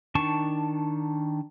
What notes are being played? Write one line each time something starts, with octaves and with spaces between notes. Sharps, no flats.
D#3 D4 A5 C#6